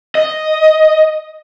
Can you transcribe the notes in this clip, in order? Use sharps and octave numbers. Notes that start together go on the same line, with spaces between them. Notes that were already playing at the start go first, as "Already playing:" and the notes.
D#5